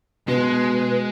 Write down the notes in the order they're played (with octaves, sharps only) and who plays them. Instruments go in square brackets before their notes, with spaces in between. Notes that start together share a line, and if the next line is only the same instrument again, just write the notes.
[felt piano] B2 [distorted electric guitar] G#3 C6 [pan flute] B4